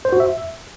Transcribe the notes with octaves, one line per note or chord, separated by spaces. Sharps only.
C5
F#4
E5